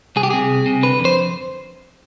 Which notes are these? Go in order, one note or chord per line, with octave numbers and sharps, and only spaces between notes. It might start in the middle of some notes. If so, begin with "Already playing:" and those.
C2 G#4
G4
C3 G#4
C2
C3
D3 B4
F2
C5